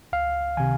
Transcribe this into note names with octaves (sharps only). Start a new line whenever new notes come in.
C#2 F5
C3 D#3 G#5